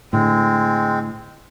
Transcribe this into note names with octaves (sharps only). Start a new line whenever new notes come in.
A2 D3 G#3 C4